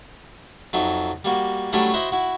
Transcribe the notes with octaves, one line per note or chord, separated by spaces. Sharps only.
F2 F#3 D#4 E5
G3 A#3 F#4
F#3 G3 A3 C#4 D4 E4
E4 F#4 C5 D#5 E5 F#5
E4 F#4